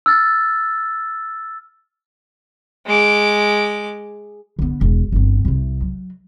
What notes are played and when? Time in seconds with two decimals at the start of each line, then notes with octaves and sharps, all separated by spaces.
0.06 E6 F6 A6
2.86 G#3 D6
4.59 D3 B3
4.81 E1
5.12 G1 C4
5.45 C2 C3
5.82 F#3